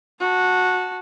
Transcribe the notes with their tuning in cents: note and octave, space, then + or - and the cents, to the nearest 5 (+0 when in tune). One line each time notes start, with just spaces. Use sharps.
F#4 -15 A5 +0